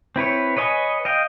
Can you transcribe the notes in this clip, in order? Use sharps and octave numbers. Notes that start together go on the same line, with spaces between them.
C4 E4 B4 C#5
B4 C#5 D#5 F5 G#5
D#5 F5 G5